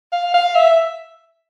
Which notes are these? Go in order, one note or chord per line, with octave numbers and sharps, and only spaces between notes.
F5
F5
E5